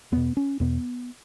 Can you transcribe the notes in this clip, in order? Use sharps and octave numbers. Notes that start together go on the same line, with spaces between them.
E2 B2 B3
C#4
E2 B2 B3